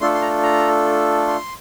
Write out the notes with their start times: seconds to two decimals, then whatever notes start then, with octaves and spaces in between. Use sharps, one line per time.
0.01 A3 D4 F4 A4 C6
0.14 C6
0.22 A#5
0.43 A#5
1.28 C6